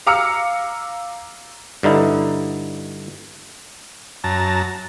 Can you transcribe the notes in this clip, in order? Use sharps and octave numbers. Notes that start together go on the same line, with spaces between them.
F5 A#5 D6 E6 F6 C#7
G2 D3 D#4 E4
F#2 A5 A#5